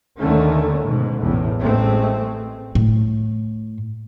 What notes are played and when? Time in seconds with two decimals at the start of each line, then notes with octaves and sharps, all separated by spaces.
0.20 D#2 D3 D#3 A3 C#4
0.81 G#2 B2
1.22 A1 E2 A2
1.61 A1 G#3 A3 C4
2.75 A2